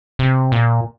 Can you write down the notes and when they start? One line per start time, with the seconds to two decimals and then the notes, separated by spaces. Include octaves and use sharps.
0.19 C3
0.52 A#2